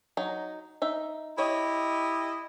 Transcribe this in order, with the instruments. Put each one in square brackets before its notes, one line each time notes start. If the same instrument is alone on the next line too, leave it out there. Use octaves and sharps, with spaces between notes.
[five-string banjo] F#3 D#4
D#4 E5
[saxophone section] E4 G4 D#5 [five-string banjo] C#5